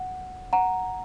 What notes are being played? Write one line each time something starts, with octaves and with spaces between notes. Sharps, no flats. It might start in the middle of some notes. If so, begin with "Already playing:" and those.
Already playing: F#5
F#5 A#5